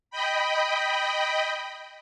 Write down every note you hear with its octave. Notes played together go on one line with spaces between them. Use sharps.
D#5 G5 B5